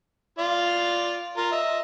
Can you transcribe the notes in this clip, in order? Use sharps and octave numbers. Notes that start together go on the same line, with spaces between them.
F4 D5 F5
F4 A#4
D#5 E5